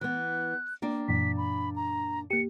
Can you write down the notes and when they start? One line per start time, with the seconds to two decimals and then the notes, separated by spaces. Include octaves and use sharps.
0.01 E3 B3 F#6
0.82 A#3 D4 G5
1.08 F#2 A#2 E3 B6
1.37 B5
1.76 A#5
2.30 A#3 G4 C#7